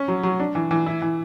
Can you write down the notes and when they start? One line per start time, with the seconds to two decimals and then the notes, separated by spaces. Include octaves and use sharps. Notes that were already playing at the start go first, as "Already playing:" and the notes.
Already playing: C#4
0.08 F#3
0.23 F#3
0.40 D4
0.55 E3
0.71 E3
0.86 E4
1.02 E3